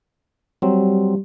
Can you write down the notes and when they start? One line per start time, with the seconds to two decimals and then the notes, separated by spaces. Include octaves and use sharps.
0.62 F#3 G3 C4